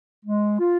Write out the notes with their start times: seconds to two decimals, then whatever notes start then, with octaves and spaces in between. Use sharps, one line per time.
0.25 G#3
0.60 F4